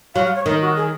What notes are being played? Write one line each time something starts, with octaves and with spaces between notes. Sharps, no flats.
F#3 F5
F5
C#5
D#3 A#4
F#4
G#4